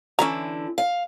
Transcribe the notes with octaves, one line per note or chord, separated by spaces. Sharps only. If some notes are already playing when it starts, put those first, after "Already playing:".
D3 E3 C#4 E4 A#5
F5